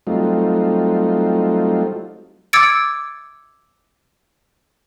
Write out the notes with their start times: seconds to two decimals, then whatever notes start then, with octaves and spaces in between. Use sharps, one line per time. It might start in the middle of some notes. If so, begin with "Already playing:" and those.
0.07 F#3 G3 A3 C4 D#4 F4
2.53 D6 E6 G#6 A6 C#7 D7